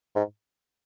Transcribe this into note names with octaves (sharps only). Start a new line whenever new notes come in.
G#2